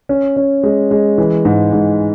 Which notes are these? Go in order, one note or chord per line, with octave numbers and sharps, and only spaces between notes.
C#4
C#4
G#3
G#3
E3
G#2
G#2